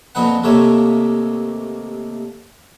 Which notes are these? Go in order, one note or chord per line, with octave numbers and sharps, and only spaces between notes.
F2 A#2 F3 B3 B4 F#5
D#2 C3 A3 A#3 C#5 E5